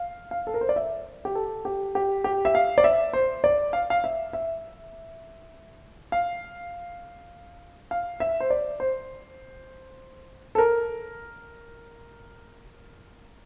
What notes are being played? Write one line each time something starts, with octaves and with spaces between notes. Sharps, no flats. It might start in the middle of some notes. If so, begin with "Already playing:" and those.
Already playing: F5
F5
A4
A#4
C5
D5
E5
G4
A4
G4
G4
G4
E5
F5
D5
E5
C5
D5
F5
F5
E5
E5
F5
F5
E5
C5
D5
C5
A4
A#4